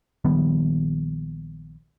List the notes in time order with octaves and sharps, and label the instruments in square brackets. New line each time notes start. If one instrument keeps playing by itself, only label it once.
[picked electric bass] A#1 D#3 G3 B3